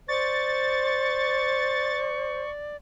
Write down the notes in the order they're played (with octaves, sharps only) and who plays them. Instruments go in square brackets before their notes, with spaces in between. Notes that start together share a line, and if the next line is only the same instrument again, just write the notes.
[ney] C5 [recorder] D5 [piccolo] C#6 [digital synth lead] A6